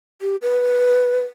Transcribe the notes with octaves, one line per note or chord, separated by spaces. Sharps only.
G4
B4